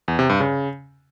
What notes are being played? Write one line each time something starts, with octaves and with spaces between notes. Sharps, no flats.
E2
C3
G2
C#3